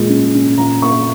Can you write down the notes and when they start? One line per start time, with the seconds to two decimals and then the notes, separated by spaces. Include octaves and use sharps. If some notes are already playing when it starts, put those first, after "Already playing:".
Already playing: A#2 G#3
0.09 C#4
0.34 C#4
0.57 A#2 A#5
0.81 A#3 C#6